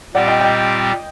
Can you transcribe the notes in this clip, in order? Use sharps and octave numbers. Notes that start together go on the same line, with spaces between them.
A#2 G3 C4 G4 D5 F#5
D#5 G5
D#5 G5